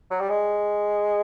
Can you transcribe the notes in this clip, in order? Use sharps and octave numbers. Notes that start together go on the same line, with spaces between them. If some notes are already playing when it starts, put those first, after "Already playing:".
F#3
G3
G#3